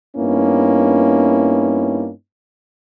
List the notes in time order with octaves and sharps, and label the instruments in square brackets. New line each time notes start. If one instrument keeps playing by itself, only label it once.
[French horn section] G2 A#3 B3 C#4 D#4 E4